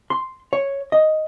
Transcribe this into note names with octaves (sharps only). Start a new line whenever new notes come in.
C6
C#5
D#5